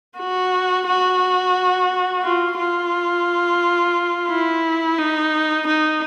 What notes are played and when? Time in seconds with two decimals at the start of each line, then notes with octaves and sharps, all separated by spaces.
0.18 F#4
0.87 F#4
2.24 F4
2.59 F4
4.29 E4
4.98 D#4
5.67 D#4